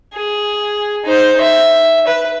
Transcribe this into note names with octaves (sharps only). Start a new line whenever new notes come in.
G#4
D#4 C5
E5
B4